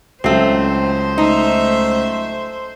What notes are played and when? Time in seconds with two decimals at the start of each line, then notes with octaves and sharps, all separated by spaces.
0.24 C#2 F#3 A3 C4 C5
1.18 A3 D#4 E5